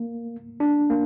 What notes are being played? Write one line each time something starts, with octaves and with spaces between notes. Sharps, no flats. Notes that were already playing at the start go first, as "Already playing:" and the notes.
Already playing: A#3
D4
A#3